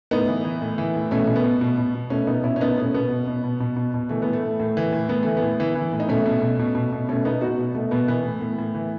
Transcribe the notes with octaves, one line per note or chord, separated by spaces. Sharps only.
A2 B3 D#4
E3
E3
A2
E3
A2
B2 A3 C#4
B2
B3
B2
B2
B2
B2
B2 A3 C#4
B2 B3 D#4
B2 C#4 E4
C#4
B2 B3 D#4
B2 A3 C#4
B2 B3
B2
B2
B2
B2
B2
B2
E3 A3
A2 B3
A3
A2
A2
E3
A2
A2 B3
E3 A3
B3
A2
E3
E3
A2
D#4
B2 A3 C#4
B2
B2
B2
B2
B2
B2 A3 C#4
B2 B3 D#4
B2 D#4 F#4
B2
B2 A3
B2 B3
E3 B3
A2
A2
A2
E3